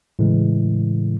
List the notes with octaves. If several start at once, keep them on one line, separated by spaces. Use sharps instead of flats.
A2 C#3 E3 G#3